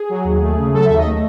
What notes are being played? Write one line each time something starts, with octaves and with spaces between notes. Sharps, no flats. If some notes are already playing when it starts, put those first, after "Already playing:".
Already playing: G#4
F#3
D#2
A3
C#3
F#3 A4
D#2 E5
D#5
A3